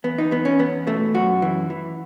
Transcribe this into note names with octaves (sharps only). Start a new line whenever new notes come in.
E2 B3
D#4
E2 B3
C#4
E2 B3
B2 A3
F#2 F#4
E3
E3